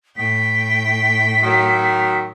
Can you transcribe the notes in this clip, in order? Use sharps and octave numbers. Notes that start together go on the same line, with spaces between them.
A2 G5 B6
D#3 F#3